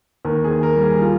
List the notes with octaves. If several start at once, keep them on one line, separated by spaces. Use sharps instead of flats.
D#2 A#4
G#4
D#2
A#4
G3
G#4
F4